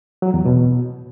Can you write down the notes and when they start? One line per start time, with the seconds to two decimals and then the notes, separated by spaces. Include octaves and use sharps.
0.22 F#3
0.34 E2
0.45 B2